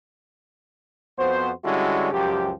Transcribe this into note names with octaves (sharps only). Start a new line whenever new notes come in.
F2 B3 F#4 C5
D3 G3 G#3 C#4 E4 F#4
C#2 F#2 F3 G4